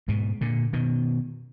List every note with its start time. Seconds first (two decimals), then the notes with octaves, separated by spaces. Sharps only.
0.08 G#2 B2
0.41 A#2 D3
0.73 B2 D#3